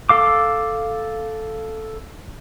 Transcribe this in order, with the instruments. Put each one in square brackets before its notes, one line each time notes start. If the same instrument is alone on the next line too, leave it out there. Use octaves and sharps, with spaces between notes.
[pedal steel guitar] A4 F5 D6